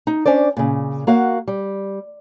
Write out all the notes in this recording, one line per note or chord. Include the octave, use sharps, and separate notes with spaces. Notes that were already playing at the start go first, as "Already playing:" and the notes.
D#4
C#4 D4 C5 D5
A#2 C#3
A#3 F#4 F5 F#5
G3